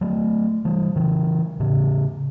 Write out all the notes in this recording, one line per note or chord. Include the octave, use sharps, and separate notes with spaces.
F#3 A3
E3 G3
C#3 E3
A2 C#3